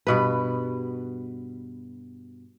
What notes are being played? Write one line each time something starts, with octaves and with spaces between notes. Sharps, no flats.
G2 B2 B4